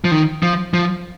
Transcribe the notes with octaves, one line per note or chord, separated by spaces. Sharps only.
F3
D#3
F3
F3